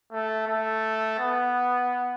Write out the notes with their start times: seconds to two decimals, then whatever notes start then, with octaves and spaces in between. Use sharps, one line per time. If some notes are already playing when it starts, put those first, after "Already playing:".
0.11 A3
0.48 A3
1.19 B3